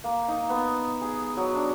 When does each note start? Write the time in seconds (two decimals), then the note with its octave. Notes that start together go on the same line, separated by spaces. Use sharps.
0.04 A#3
0.28 D#4
0.50 B3
1.01 G#4
1.37 F#3
1.55 D4